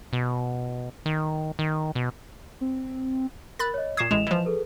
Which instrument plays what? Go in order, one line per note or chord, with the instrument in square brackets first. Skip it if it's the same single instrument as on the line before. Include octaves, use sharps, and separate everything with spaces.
[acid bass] B2
D#3
D#3
B2
[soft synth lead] C4
[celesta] A#4 [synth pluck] B5 F#6 A6
[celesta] C#5 D#5
[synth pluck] A#2 C#6 D#6 [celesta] G#6 C7 E7
[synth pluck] A1 A2 G#3 [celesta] D#5 E7 F7
[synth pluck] E3 F3
[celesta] G#4 A4 B4